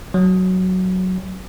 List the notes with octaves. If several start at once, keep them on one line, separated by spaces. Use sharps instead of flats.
F#3